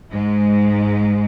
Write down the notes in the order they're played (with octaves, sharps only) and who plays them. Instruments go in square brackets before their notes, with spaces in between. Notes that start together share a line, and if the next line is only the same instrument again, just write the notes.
[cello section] G#2 G#3